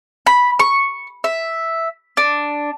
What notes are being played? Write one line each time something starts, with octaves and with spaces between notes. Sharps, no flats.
B5
C#6
E5
D4